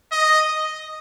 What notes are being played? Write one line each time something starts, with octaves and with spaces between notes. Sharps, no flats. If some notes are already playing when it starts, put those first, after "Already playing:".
D#5